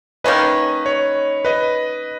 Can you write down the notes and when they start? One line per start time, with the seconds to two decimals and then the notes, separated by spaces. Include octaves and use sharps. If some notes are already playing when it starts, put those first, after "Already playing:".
0.24 D#3 A#3 C#4 B4 D#5
0.86 C#5
1.45 B4 D#5